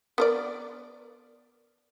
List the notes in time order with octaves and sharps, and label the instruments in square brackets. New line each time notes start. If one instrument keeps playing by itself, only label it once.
[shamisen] B3 A#4 D5